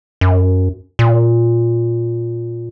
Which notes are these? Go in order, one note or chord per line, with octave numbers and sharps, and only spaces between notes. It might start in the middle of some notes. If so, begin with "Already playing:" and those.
F#2
A#2